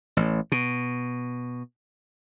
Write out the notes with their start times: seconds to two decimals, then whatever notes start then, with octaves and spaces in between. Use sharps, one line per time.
0.17 A1
0.52 B2